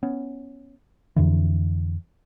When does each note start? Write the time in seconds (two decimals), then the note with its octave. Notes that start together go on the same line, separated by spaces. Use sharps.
0.03 B3 C#4
1.16 F2 D3 E3